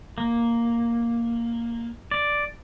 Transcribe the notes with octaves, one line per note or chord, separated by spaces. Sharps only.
A#3
D5